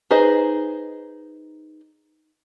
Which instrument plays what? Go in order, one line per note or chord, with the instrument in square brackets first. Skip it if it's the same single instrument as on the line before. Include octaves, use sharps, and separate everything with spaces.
[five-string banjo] D#4 G#4 B4 C5 D#5